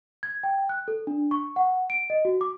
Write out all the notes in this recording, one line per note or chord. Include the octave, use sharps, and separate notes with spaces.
G#6
G5
F#6
A4
D4
C#6
F#5
D7
D#5
F#4
D6